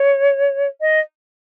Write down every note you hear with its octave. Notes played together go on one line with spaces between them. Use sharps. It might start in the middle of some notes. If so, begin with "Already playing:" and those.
Already playing: C#5
D#5